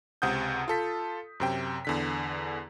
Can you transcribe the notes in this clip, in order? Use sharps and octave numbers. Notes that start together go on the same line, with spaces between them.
C#2 C3 F#5 D#6 G6
F4 A4 B6
F#2 C3 G5
E2 D3 B6